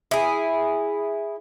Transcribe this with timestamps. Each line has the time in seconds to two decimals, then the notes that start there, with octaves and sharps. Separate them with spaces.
0.11 E4 G#4